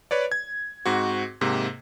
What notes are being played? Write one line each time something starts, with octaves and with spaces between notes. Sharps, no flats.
B4 C#5 D5
G#6
G#2 C4 F#4
G#2 C3 A#3